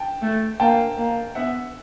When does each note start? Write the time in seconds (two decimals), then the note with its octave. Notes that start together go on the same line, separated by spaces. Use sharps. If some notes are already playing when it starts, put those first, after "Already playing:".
Already playing: G5 A5
0.22 A3
0.60 A#3 G5 A5
0.97 A#3
1.35 B3 E5 F#5